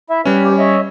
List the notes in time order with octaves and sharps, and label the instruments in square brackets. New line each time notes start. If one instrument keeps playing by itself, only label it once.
[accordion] E4 E5
[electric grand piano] G3 C#4 [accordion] B4
[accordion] D#2 G4
C#5 D#5 E5